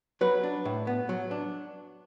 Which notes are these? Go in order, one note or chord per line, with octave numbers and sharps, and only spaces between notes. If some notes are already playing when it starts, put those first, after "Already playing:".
F#3 B4
D4
A2
B3
F#3
D4